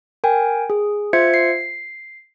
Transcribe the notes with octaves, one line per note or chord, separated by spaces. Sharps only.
A#4 G5 G#5
G#4
F4 C5 E5 G#6 C#7
C7